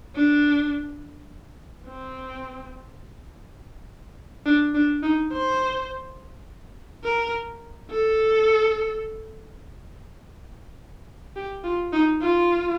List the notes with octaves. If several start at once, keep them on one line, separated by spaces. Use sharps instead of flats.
D4
C4
D4
D4
D#4
C5
A#4
A4
G4
F4
D#4
F4